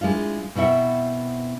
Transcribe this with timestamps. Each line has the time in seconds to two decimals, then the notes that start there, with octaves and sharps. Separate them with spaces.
0.01 G#3 D4 E4 F4
0.55 B2 C4 E4 E5 F#5